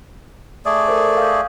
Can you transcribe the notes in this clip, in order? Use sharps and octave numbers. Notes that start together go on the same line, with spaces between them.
A3 G#4 D5 D#6
A4 A#4 C5
F5 D#6 G6